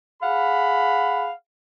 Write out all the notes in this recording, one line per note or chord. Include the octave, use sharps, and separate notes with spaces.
G#4 F5 F#5 B5